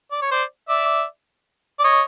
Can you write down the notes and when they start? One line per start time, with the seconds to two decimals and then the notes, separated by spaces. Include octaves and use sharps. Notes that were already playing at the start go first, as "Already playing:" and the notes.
0.12 D5
0.22 C#5
0.32 C5 D5
0.69 D5 E5
1.79 D5
1.84 C#5 D#5